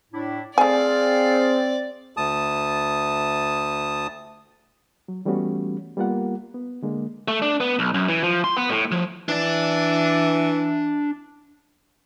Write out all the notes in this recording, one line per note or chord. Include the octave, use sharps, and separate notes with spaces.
A2 D4 E4
A3 C4 G#4 D5 F5 G#5
D2 A5 D#6
F#3
E3 G3 A3 B3 C#4 F#4
G3 A#3 B3 F4 A#4 F#5
B3
D3 G#3 A#3
A3
D4
B3
B1
F#2
E3
F3
C6
B3
A2
F3
E3 D4 D5